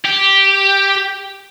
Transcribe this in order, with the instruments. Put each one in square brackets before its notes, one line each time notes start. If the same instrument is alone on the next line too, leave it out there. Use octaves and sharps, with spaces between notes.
[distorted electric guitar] G4